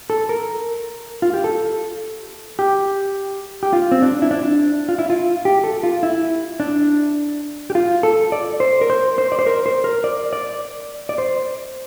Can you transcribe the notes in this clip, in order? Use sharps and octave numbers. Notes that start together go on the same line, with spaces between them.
A4
A#4
F4
G4
A4
G4
G4
F4
C4
D4
E4
D4
F4
E4
F4
G4
A4
F4
E4
D4
G4
F4
A4
D5
C5
A#4
C5
C5
D5
C5
A#4
C5
A#4
D5
D5
D5
C5